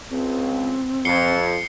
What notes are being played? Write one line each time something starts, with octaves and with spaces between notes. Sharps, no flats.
C#2 C4
F2 C7 C#7 G7